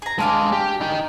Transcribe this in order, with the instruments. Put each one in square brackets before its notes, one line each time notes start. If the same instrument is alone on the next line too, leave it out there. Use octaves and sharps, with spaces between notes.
[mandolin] G#4 A#5
[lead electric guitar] G#3 F5 [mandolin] D4 G#5 D6
[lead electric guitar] G4
D#4 G5